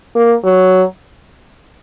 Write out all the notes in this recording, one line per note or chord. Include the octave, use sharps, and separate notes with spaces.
A#3
F#3